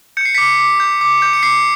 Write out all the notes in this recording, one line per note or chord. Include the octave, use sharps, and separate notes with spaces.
G6 C#7
C7
D6 B6 C#7
D6
G6
D6
G6
C#7
D6 C7